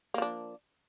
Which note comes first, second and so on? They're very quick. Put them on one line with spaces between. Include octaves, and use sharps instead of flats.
A#3 F3 D4